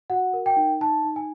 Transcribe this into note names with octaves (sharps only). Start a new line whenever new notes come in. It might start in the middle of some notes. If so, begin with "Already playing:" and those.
F#4 F#5
A#4
G5
D#4
D#4 A5
D#4
G#5